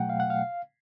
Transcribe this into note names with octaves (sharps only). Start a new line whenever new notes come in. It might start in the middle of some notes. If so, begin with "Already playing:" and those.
Already playing: B2 F#3 A3 F#5 G5
F5
F#5
F5